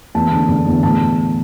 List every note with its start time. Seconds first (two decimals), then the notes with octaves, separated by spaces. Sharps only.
0.15 E2 A5
0.32 D3
0.49 D3
0.66 E2
0.83 A2 A5